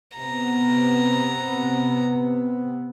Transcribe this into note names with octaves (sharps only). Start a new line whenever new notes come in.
C3 B3 A#5